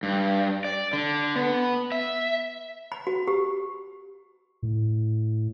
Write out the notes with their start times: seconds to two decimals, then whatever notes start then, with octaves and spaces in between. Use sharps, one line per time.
0.03 G2
0.65 D5
0.93 D3
1.36 B3
1.92 E5
2.92 B5
3.07 F#4
3.28 G4
4.63 A2